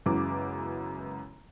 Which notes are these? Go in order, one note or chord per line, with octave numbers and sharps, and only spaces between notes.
F#2 C#3 E3 G#3 B3 D6